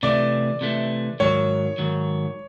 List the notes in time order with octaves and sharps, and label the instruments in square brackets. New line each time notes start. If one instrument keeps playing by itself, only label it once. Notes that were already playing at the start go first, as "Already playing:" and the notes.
[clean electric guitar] C3 E3 A3 [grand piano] D5
[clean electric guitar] C3 E3 A3
[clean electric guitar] G#2 D#3 F#3 [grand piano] C#5
[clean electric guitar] G#2 D#3 F#3